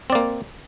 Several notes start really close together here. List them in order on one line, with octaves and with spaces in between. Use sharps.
C4 D5 A#3